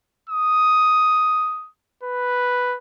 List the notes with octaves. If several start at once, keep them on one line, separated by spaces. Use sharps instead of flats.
D#6
B4